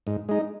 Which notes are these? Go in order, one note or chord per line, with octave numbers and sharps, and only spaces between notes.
G#2
G#3 D#4